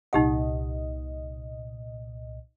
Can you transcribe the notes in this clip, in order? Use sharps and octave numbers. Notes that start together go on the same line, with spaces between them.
C2 A#2 D#4 G4 D#5 F#5